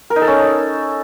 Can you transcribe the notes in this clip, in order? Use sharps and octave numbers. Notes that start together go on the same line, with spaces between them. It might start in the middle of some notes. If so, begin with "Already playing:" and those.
A#4
D#4
A4
C#4